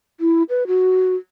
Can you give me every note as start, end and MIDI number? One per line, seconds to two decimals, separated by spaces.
0.20 0.43 64
0.49 0.67 71
0.67 1.15 66